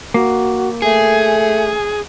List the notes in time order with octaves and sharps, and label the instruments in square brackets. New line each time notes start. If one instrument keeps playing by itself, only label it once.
[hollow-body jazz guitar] A#3 [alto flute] F#4
[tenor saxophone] A3 [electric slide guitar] G#4 [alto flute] G#5